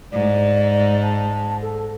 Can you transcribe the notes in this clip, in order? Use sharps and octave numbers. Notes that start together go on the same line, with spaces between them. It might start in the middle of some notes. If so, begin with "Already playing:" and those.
G#2 D5
A5
A4